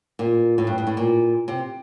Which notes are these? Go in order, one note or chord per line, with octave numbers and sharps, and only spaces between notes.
A#2
A2
G2
G2
A2
A#2
C3